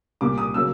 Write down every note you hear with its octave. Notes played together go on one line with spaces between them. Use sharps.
C2 A#2 G3 A#3 D6
D#6
C#3 F#3 A#3 E6